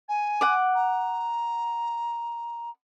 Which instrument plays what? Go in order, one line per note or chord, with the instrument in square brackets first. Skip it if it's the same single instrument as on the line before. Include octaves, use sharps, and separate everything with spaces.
[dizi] G#5
[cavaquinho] F#5 D6
[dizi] A#5